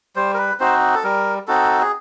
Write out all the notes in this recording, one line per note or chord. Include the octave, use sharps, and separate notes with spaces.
G3 C5
A#4
B4
C4 D#4 F#4 C5
A4
G3 A#4
C4 D#4 F#4 A4
G#4